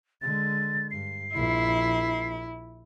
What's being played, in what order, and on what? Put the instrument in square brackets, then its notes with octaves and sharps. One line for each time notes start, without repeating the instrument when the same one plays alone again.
[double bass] D3 G#3 [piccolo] A6
[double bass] G2 [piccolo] C7
[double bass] A#1 [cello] E4